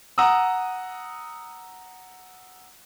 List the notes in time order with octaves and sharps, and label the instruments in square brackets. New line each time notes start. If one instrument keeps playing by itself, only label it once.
[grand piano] F#5 A#5 D#6 E6